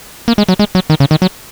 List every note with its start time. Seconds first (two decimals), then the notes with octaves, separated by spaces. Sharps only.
0.28 A#3
0.38 G#3
0.49 F#3
0.59 G#3
0.75 F#3
0.90 D#3
1.00 C#3
1.11 D#3
1.22 F#3